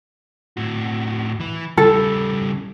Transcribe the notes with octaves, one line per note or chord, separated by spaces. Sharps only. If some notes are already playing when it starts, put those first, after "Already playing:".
A2 F#4
E3 B4
C#3 G3 A4